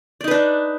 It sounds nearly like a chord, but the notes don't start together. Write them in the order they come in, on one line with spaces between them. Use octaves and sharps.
D5 D#4 B4 D4